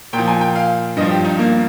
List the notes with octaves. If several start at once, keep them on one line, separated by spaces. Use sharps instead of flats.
A#2 G5
F3
G#5
G5
F5
G2 F3 D#5
G4
D#4
A#3